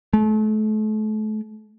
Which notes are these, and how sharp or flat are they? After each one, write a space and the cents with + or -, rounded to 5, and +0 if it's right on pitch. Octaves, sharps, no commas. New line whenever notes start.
A3 -35